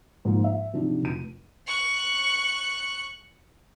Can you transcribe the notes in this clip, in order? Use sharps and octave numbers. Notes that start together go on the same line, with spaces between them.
G#2 F3 A#3
E5
C3 F3 F#3 D4 D#4 F#4
F1 D#7
C#6 F#6